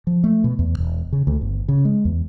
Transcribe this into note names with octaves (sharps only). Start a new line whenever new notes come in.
F3
A3
B2
E2
E1
C#3
D2
G1
C#3
G#3
E2